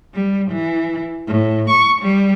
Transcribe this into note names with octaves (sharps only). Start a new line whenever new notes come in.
G3
E3
A2
C#6
G3